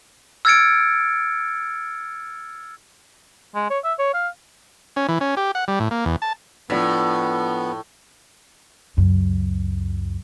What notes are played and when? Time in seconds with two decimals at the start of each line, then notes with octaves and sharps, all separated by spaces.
0.45 E6 F6 G#6 A6 C#7 D7
3.55 G#3
3.70 C#5
3.84 E5
3.99 C#5
4.14 F5
4.96 C#4
5.09 E3
5.21 C#4
5.37 G4
5.55 F#5
5.68 G3
5.80 A2
5.91 A#3
6.05 E2
6.22 A5
6.70 A2 F3 B3 D4 B6
8.97 C#2 F#2